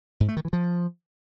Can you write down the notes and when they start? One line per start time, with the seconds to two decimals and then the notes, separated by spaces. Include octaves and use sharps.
0.20 G#2
0.28 A3
0.37 D#3
0.45 E3
0.53 F3